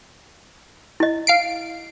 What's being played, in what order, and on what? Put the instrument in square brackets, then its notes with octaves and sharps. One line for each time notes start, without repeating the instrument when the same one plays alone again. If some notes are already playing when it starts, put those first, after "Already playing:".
[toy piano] E4 D#5
[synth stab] F5 C7 D7